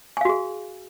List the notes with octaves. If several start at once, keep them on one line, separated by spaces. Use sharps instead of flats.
F#4 G#4 F5 G#5